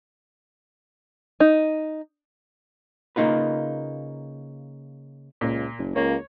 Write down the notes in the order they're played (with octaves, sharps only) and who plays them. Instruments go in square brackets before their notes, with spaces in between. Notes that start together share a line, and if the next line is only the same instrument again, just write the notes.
[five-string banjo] D#4
[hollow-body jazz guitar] C#3 A#3 D#4 F4 B4
[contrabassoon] C#2 [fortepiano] A#2
[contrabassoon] F#1
[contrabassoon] C#2 [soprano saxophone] A#3 [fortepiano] C#5